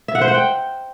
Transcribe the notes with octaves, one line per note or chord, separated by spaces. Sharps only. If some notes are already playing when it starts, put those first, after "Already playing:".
E5
F#5
C5
F#5
G5